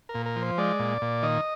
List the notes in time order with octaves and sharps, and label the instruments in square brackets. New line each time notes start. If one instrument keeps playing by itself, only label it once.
[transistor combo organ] A#4
A#2
A#4
F3
C5
G#3 D5
A#2
A#2
D#3 D#5